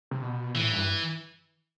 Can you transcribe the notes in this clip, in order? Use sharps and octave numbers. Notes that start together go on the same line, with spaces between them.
C3
B2
A2 E3
G2